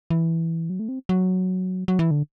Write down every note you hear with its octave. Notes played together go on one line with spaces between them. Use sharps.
E3
F#3
A3
C4
F#3
F#3
E3
D3